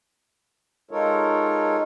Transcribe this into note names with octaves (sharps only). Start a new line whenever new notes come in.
G#3 D#4 F4 A4 A#4 C#5